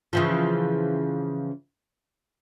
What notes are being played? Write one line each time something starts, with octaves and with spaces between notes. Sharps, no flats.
C#3 E3 F3